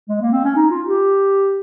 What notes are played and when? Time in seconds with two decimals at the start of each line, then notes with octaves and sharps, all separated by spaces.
0.09 G#3
0.21 A#3
0.32 C4
0.44 C#4
0.56 D#4
0.71 F4
0.87 G4